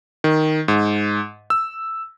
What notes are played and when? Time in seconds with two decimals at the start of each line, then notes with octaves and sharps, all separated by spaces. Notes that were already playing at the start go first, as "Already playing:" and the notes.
0.24 D#3
0.68 G#2
1.50 E6